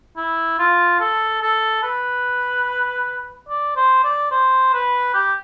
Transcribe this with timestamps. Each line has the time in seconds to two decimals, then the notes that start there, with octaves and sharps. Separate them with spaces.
0.17 E4
0.59 F4
1.00 A4
1.42 A4
1.83 B4
3.49 D5
3.76 C5
4.04 D5
4.31 C5
4.73 B4
5.14 G4